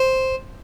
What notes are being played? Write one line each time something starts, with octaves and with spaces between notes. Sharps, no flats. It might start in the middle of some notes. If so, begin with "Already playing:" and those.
Already playing: C5